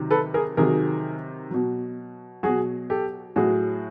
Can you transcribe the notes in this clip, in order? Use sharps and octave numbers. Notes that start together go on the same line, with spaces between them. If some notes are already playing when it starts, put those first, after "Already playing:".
Already playing: C3 D#3 F#3
A4 B4
G#4 A#4
C3 D#3 F#3 G#4 A#4
B2 F#3
B2 F#3 F#4 G#4
G4 A4
A2 F#3 F#4 G#4